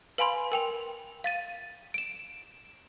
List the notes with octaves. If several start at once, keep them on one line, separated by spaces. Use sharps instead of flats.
B4 F5 G#5 B5 C6
A#4 G5 F7
F5 A6 D#7
D7 E7